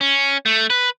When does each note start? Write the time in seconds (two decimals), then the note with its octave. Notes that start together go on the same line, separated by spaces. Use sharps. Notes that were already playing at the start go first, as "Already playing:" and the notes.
0.01 C#4
0.46 A3
0.70 B4